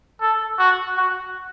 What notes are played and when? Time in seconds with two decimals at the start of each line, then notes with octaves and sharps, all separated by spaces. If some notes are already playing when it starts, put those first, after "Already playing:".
0.21 A4
0.59 F#4
0.97 F#4